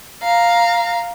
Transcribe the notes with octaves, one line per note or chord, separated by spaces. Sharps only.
F5 A#5